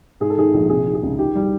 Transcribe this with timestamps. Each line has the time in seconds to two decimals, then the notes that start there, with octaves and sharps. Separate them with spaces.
0.20 G#2 G#4
0.30 A4
0.38 D#3 G#4
0.54 A#1
0.69 C3 G#4
0.86 D#3
0.95 G#4
1.03 C#2
1.18 D#3 G4
1.35 G3